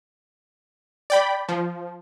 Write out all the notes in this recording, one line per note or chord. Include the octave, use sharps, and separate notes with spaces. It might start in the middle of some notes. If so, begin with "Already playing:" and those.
D5 G5 B5
F3